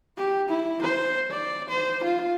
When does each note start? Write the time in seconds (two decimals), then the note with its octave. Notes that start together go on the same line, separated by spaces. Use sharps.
0.17 G4
0.49 E4
0.82 C5
1.30 D5
1.69 C5
2.03 F4